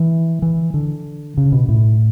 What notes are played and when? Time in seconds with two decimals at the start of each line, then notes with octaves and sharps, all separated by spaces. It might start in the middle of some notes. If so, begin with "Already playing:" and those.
Already playing: E3
0.42 E3
0.74 D3
1.38 C#3
1.52 B2
1.69 A2